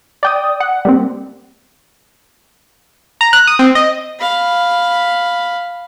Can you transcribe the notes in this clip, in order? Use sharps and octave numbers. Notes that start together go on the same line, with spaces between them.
D5 G5 D#6
F#5
G3 A#3 C4
A#5
F#6
D#6
C4
D#5
F5 B5